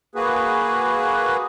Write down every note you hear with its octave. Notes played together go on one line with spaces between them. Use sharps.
A#3 F#4 G#4 B4